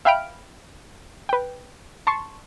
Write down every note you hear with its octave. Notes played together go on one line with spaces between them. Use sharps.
E5 F5 G5 B5 F6 D7
B4 G5
A5 C6 C#6